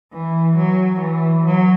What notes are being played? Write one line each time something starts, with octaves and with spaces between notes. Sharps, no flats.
E3
F#3
E3
F#3